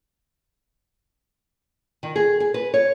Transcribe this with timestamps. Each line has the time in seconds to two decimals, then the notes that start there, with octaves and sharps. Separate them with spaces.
2.03 D#3
2.16 G#4
2.40 G#4
2.54 B4
2.74 C#5